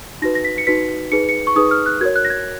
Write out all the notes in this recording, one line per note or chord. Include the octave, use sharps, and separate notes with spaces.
D#4 F#4 B4 A#6
A#6
B6
C#7
D#4 F#4 B4 B6
D#4 G#4 B4 C#7
C#7
C#6
D#4 G#4 B4 D#6
F6
F#6
F#4 A#4 C#5 G#6
F#6
A#6
G#6